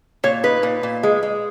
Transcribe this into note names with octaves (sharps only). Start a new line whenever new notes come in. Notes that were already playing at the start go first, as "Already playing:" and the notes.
A#2 C#5
D#4 B4
A#2
A#2
G#3
G#3